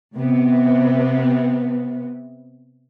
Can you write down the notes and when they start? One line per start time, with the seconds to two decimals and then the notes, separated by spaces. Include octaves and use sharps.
0.16 C3 B3